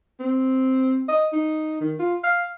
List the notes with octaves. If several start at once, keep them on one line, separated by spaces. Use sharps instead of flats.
C4
D#5
D#4
D#3
F4
F5